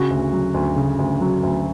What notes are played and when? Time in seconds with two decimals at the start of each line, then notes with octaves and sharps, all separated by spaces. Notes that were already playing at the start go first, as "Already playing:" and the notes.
Already playing: C#3 F#4
0.10 D2
0.33 F#3
0.54 D2
0.76 C#3
0.99 D2
1.21 F#3
1.43 D2